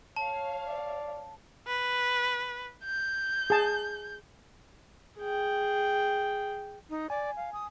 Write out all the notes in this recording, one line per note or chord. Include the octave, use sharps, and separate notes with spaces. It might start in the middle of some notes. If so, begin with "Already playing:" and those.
C#5 F5 A5
D5
B4
G6
G#4 A5
G#4 G5
D#4
D5 G#5
F5
D#6